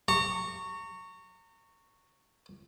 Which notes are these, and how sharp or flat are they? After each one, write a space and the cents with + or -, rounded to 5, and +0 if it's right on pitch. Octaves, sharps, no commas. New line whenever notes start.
A#5 -35 C#6 +0